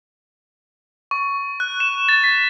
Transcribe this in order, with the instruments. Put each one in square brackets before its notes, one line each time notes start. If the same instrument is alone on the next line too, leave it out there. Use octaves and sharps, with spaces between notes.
[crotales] C#6
F#6
E7
A6
B6